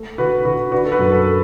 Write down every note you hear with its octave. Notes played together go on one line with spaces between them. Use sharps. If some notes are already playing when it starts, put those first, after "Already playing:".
Already playing: A3
D3 F#4 B4
D3 F#4 B4
D4 F#4 B4
A4
F#4 B4
F#2
A4